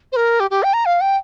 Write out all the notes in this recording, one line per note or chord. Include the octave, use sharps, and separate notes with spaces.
C5
A#4
G4
G4
G5
A#5
F5
G5